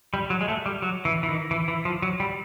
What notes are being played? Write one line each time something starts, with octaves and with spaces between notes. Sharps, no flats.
G3
F#3
G#3
A3
G3
F#3
E3
E3
D#3
E3
E3
F3
F#3
G3